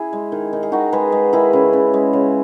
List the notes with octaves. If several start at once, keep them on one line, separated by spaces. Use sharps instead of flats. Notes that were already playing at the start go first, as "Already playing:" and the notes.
Already playing: E4 G#4
G#3
D#3
D#3
G#4
D#3 D#4 F#4
G#3 G#4 B4
G#3
D#3 E4 G#4
C#3
C#3
G#3
C#3